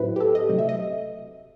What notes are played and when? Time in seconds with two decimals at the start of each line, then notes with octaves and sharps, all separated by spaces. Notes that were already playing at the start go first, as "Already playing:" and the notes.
Already playing: A2 F#3 C4 E4 B4
0.16 G4
0.20 A4
0.35 D#5
0.49 C3 F#3 A3 C4
0.58 E5
0.69 D#5